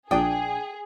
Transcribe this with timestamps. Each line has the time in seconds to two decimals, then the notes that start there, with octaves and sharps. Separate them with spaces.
0.11 A#1 D4 G#4 G5 D#6